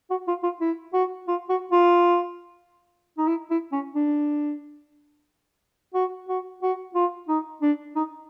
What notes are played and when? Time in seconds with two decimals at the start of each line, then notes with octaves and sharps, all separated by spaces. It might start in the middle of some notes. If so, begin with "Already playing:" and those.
0.10 F#4
0.28 F4
0.43 F4
0.61 E4
0.93 F#4
1.28 F4
1.49 F#4
1.72 F4
3.18 D#4
3.27 E4
3.50 E4
3.72 C#4
3.95 D4
5.94 F#4
6.28 F#4
6.62 F#4
6.95 F4
7.28 D#4
7.62 D4
7.96 D#4